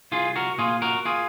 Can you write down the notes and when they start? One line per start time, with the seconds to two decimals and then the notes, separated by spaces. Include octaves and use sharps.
0.12 C2 F4 G#4
0.36 F#4 A#4
0.58 A#2 F4 G#4
0.82 F#4 A#4
1.05 F4 G#4